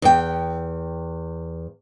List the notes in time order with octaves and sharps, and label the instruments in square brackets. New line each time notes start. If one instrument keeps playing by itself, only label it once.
[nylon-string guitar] E2 G5